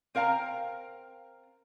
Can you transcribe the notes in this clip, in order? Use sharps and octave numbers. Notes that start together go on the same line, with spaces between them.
C4 A#4 F5 A5 A#5